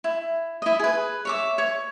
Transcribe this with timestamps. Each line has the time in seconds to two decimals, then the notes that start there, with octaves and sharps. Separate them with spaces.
0.04 E4
0.62 E4 D#5
0.79 G#4 B4
1.25 C#5 E5 D6
1.58 C#5